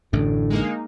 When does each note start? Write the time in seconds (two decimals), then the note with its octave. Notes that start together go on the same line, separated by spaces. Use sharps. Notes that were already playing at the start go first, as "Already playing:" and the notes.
0.13 A1 F#2 A2 D3
0.50 G#3 A#3 D#4